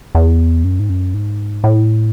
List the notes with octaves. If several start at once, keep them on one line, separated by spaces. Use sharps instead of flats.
E2
F#2
G#2
F#2
G#2
A2